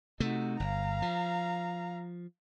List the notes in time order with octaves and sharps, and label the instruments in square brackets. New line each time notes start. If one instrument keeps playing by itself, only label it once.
[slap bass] C3 A3 [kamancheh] D#4 F#4
[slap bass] G1 [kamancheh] F5 A#5
[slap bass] F3